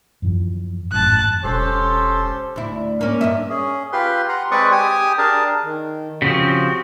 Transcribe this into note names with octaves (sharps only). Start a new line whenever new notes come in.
F#2 E3 F3
G#1 F#2 A2 A5 F#6
E1 C#4 G4 A4 C5
D2 E4
A#3 C#4
G2 D#5 E5
C#4 G#4
F4 G4 B4 C6
F#5 A#5 C6
G#3 C4 B4 D5 C#6 D#6
G4 G#5 D#6
D4 G#4 A#4 A5
D#3
C#3 F3 C4 F#4 G4